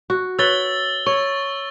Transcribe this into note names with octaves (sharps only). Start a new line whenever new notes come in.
F#4
B4 C#5 E6 A6 G7
C#5 C#6